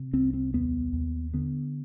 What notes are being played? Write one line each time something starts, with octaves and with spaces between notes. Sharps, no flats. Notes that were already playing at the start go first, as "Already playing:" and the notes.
Already playing: C3
C2 C4
C4
D#2 B3
D#2
D3 B3